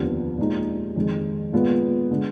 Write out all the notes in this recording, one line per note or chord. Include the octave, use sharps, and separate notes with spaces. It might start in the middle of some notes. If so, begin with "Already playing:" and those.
Already playing: F1 D#2 D3 F3 B3
A#2 G#3 D#4
F2 D#3 G#3
A#2 G#3 B3 F4
D3 G#3